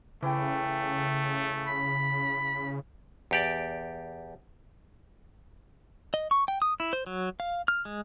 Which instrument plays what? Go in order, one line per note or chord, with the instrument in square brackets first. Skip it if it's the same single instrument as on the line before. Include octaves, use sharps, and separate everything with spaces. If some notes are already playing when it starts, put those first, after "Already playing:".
[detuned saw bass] C#3 [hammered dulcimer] E3 G5 [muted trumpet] A3
[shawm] B5
[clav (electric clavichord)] E2 G4 D5
[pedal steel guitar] D#5
C#6
G5
D#6
E4
C5
F#3
F5
F6
G#3